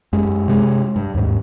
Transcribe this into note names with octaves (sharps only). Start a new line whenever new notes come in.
F#2 G#3
C3 G3 G#3
G2
D#2 G#2